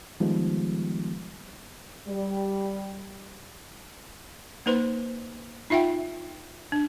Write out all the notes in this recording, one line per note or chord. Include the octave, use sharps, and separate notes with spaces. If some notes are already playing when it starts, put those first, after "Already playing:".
D#3 F3 G3 G#3 B3
G3
A#3 D#4 B4 C5 C6
D#4 F4 E5 F#5 G5
D4